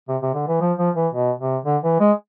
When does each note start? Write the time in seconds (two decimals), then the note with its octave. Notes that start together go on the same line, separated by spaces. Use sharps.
0.08 C3
0.22 C3
0.34 D3
0.48 E3
0.60 F3
0.78 F3
0.96 E3
1.13 B2
1.39 C3
1.65 D3
1.83 E3
2.00 G#3